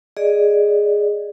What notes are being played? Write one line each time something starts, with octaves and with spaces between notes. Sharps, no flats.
G#4 D5 D#5